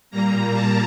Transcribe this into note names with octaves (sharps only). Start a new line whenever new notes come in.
A#2 G3 A#3 A#5
A5